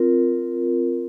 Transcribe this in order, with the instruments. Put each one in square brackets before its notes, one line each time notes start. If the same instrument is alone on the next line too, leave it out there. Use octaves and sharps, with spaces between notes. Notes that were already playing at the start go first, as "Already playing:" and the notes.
Already playing: [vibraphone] C4 F4 A#4